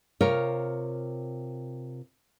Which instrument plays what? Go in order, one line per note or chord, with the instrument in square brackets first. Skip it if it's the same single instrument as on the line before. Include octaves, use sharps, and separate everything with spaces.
[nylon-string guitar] C3 F4 A#4 C#5